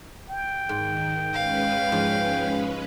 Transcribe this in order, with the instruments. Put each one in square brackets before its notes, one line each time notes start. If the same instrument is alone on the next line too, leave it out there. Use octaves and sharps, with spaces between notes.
[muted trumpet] G5
[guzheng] G#2 [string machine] D#3
[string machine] G#3 C#4 B4 [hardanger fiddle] F5
[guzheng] G#2 F3